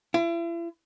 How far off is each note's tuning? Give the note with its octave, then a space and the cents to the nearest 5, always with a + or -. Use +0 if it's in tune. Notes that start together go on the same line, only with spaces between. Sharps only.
E4 +40